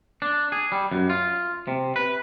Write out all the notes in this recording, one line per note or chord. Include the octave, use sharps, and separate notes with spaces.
D4
G#4
G3
F#2
F4
C3
B4